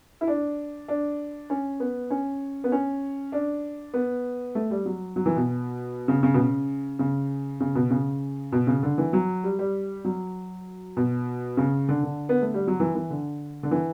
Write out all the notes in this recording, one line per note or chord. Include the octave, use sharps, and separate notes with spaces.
E4
D4
D4
C#4
B3
C#4
B3
C#4
D4
B3
A3
G3
F#3
F#3
E3
B2
C#3
C#3
B2
C#3
C#3
C#3
B2
C#3
B2
C#3
D3
E3
F#3
G3
G3
F#3
B2
C#3
D3
D3
B3
A3
G3
F#3
E3
E3
D3
D3
E3